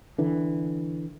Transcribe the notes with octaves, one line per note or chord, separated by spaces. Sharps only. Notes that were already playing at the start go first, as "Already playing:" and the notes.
D3 E3